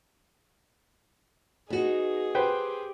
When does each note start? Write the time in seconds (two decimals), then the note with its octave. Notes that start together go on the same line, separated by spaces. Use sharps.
1.70 B3 D#4 F#4 G#4
2.35 G4 B4 C5 G5